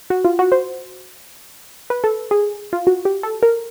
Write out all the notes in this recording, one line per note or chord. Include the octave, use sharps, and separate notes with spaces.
F#4
F4
F#4
C5
B4
A4
G#4
F4
F#4
G4
A4
A#4